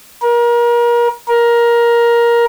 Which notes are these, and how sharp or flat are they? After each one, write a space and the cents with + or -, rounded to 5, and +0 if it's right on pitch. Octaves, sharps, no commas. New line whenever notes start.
A#4 +30
A#4 +15